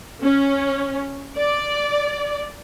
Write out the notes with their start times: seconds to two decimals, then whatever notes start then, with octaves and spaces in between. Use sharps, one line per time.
0.23 C#4
1.38 D5